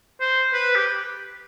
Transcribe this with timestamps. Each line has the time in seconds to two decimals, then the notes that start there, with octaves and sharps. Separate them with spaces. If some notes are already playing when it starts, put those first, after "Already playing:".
0.21 C5
0.53 B4
0.75 G4